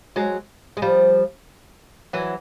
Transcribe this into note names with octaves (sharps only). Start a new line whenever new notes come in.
F#3 G#3
G#3
F3 G3
E3 F#3